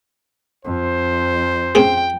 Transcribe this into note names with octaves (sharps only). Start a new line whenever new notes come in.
F2 C5
C4 C#4 G#4 G5